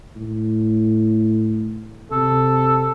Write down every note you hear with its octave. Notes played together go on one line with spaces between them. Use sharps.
A2
C3 A4